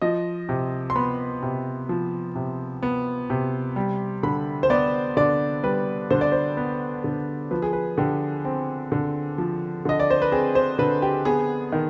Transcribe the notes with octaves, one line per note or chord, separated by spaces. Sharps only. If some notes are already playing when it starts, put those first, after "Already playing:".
F3 D#5
C3
C6
B3 B5
C3
F3
C3
B3
C3
G3
D3 B5
C5
B3 D5
D3 D5
G3 B4
D3 C5
D5
C5
B3
D3
F3 B4
G#4
B4
D3 G4
C4
D3
F3
D3 D#5
D5
C5
B4
C4 G#4
C5
D3 B4
G4
B3 G#4
D#3